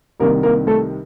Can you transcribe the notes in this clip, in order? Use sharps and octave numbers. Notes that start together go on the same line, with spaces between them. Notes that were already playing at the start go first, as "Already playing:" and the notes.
C2 C3 D#3 A#3 A#4
A#3 A#4
A3 A4